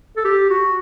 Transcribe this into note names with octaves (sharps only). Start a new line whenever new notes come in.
A4
G4
F#4